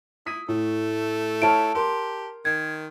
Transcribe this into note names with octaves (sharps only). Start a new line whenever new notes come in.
E4 D#6 B6 D#7
A2 A3
E4 C#5 A5 F6 D7
G4 A#4 C6
D#3 G#6